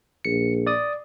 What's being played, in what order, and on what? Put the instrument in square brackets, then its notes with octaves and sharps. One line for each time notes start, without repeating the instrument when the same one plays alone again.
[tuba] A#1 [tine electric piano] C#7
[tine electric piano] D5 D#6